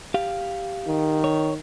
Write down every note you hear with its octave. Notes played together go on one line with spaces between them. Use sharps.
G4 F5
D#3
C#5